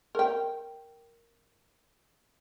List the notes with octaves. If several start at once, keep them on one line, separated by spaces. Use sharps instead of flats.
A#4 G5